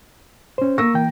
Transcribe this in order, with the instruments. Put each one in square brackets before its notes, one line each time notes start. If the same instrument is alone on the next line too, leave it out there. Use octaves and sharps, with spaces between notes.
[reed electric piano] C#4 C5
[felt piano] A#3 A#6 [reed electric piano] C#6 E6
[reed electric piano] E3 G5